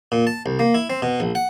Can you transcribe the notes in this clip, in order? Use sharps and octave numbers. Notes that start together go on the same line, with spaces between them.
A#2
A5
C2
A#3
E4
C4
B2
A#1
F#5